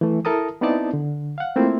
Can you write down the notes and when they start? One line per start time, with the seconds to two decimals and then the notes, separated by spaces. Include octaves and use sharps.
0.01 E3 A3
0.25 E4 A4 A#4 A5 A#5 D#6
0.61 B3 C4 D#4 E4 D5 A5
0.93 D3
1.38 F5 F#5
1.56 A3 A#3 C4 E4 F4